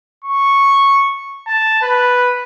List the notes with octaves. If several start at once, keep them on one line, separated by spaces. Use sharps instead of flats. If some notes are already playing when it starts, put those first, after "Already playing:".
C#6
A5
B4